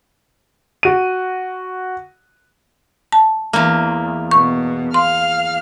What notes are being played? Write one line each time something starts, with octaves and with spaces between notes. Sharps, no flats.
F#4 D#7
A5
E2 A#3
B2 C#6
F5 C6 F6